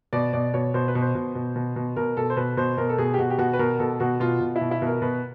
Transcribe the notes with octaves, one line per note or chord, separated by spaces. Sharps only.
B2 D5
B2 D5
B2 C#5
B2 C5
B4
B2
C5
B2
B2
B2
B2
B2 A#4
B2 A4
C5
B2 B4
B2 C5
B2 A#4
A4
B2 G#4
G4
B2 F#4
G4
B2 F#4
B4
B2 A#4
B2 A4
B2 F#4
B2 F4
B2
E4
B2
E4
B2 A#4
B2 B4